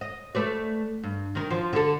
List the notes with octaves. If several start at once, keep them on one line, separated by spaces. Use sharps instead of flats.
D#5
A3 B4 D5
G2
D#3 A#4
F3
D3 A4